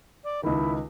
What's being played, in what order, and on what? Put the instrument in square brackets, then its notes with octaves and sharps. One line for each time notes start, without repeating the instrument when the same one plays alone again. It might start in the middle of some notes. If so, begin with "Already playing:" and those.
[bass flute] D5
[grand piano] C#2 D#3 [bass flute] E4